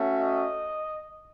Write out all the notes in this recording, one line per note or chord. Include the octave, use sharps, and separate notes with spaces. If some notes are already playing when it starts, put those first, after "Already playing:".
Already playing: A3 C#4 F#4
D#5